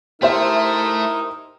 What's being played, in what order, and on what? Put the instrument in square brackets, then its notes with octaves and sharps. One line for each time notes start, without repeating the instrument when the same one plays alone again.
[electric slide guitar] A3 [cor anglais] D#4 [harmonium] E4 A#4 [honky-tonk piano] G4 C5 E5